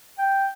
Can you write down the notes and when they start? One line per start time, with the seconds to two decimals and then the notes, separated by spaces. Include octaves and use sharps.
0.18 G5